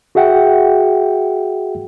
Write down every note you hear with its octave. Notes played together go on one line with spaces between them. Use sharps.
F#4 G#4 E5 F#5 G5